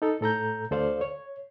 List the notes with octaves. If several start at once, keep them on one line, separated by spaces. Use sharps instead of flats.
D#4 A4
A2 A4 A#5 G6
D2 A4 C5 D5 F5
C#5